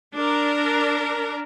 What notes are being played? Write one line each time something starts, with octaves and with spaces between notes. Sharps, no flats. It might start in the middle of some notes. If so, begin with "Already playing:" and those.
D4 A#4